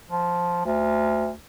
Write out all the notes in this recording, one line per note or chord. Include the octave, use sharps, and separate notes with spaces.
F3
D2